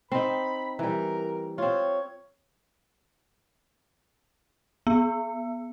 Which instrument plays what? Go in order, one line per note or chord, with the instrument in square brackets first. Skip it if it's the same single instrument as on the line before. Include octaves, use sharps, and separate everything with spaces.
[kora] C4 D#4 [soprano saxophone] B5
[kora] E3 G3 [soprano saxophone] A#4
[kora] C4 F4 [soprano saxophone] C#5
[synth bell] B3